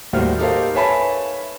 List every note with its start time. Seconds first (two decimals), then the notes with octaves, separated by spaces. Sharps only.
0.13 D#2 A2 G3 F#4 C5 F6
0.39 D#4 G4 A4 A#4 C5 F5
0.75 B4 C#5 E5 G#5 A5 B5